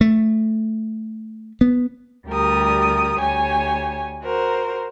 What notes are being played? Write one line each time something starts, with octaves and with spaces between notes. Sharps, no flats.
A3
B3
D2 G3 G4 A#4 D#6
D2 G4 C#5 G#5
F#4 A#4 C5